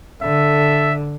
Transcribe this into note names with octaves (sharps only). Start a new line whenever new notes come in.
D3 A4 E5